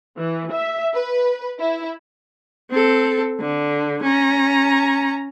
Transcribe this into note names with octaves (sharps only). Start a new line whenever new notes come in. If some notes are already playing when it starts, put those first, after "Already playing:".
E3
E5
B4
E4
C4 A4
D3
C#4 A#5